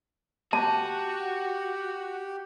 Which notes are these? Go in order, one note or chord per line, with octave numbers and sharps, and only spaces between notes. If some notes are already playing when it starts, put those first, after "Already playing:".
F#4 G4 A5